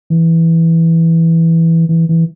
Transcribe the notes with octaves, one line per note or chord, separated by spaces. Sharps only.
E3
E3
E3